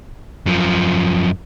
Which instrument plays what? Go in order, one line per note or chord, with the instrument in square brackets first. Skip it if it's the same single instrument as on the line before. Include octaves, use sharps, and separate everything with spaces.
[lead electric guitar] F#2 F3